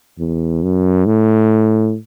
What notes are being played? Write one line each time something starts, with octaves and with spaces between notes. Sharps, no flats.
E2
F#2
A2